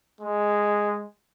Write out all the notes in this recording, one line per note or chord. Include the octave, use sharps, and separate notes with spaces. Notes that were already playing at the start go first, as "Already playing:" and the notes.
G#3